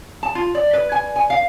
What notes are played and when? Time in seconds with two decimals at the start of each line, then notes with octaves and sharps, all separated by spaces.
0.23 A5
0.35 F4
0.55 D5
0.73 B4
0.92 G#5
1.16 G#5
1.30 F5